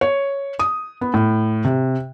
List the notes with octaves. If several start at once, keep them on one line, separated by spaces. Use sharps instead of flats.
C#5
D#6
B3
A2
C3